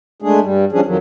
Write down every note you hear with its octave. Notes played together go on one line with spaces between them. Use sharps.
G#3 A3 D4 G#4
G2 G3
F3 G3 C#4 D4 G#4
F2 D#3 F3 F#3